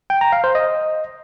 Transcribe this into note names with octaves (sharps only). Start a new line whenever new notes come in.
G5
A#5
F5
C5
D#5